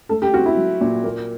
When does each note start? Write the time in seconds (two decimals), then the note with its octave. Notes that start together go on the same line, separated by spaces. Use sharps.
0.09 A3 A4
0.22 G4
0.34 C4 F#4
0.46 E4
0.57 F#3
0.81 A#2
1.04 A#3